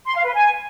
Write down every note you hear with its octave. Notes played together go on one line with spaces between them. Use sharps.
C6
F5
B4
G#5